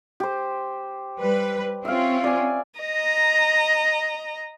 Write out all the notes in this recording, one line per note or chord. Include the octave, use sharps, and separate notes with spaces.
G4 C5
G3 B4
C4 C#4 F4 E5 F5
D5 G#5
D#5 A#5